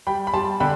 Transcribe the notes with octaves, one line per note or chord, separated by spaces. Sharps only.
G3 G5 B5
B5
G3 A5 C6
D3 G5 B5